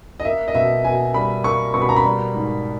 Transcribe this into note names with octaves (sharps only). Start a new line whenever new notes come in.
D#5
A#3 E5
D#5
B2 E5
B2 G#5
G3 B5
A#3 C#6
B2 C#6
B5
A#5
B5
G3
G#2